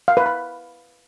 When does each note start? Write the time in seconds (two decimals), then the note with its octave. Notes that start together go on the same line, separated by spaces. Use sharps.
0.08 F5
0.17 B4
0.26 B5